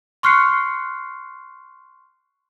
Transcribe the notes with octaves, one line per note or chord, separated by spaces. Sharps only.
C6 C#6 F6 F#6 C7 C#7